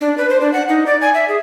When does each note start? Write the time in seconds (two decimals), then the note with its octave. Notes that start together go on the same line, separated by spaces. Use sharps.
0.01 D4
0.18 B4
0.30 C5
0.41 D4
0.53 F#5
0.68 D#4
0.86 D5
1.01 G#5
1.14 E5
1.28 G#4